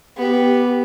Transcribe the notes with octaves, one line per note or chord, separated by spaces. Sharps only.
B3 G4